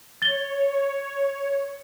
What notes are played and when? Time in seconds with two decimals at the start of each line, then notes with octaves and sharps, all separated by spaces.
0.22 C#5 A6 G7